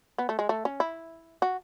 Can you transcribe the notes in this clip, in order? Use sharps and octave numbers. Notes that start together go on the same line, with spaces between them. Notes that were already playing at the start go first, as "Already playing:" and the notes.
B3
A3
G#3
A3
C#4
E4
F#4